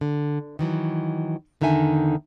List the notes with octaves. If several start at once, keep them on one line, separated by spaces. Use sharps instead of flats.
D3
D#3 E3 F#3
E2 D3 D#3 D#4 E5 G#5